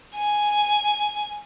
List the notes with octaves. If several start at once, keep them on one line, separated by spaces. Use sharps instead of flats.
G#5